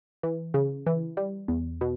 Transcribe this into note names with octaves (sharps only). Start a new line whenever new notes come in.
E3
C#3
E3
G3
E2
B2